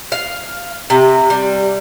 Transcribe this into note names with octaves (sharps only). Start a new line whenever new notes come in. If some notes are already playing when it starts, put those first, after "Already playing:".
F5
C3
G3